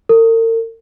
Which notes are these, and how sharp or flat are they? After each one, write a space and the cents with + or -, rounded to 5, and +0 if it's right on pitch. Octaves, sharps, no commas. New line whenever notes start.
A#4 -45